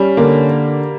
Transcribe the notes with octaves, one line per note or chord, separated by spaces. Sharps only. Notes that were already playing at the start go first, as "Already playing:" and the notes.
Already playing: G3 C#4
D3 A#3